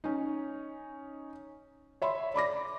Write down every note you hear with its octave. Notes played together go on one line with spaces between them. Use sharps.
C#4 D#4
C#5 E5 B5 C6
D5 B5 D6 A#6